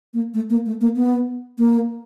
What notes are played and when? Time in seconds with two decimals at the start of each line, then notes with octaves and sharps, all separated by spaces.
0.14 A#3
0.34 A3
0.50 A#3
0.66 A3
0.81 A#3
0.96 B3
1.58 A#3